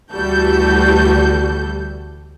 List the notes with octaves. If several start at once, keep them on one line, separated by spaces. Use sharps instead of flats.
D2 E3 G3 F#4 A4 G6